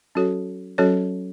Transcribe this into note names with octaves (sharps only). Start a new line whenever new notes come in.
F#3 C#4 F#4 A4 C#5
F#3 C#4 F#4 A4 C#5